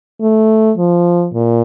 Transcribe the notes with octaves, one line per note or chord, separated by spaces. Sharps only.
A3
F3
A#2